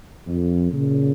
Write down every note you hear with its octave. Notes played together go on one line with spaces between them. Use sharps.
F2
A#2 C#3